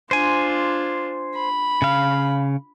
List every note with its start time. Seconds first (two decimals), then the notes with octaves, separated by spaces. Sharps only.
0.11 D4 F4 C5 G#5
1.35 B5
1.82 C#3 F5